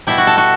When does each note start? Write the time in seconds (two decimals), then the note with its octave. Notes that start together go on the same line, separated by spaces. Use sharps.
0.07 B2 G3 E4
0.18 F#4
0.27 A4
0.37 F#4